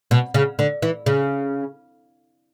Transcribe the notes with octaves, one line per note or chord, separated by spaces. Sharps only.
B2
C#3
D3
E3
C#3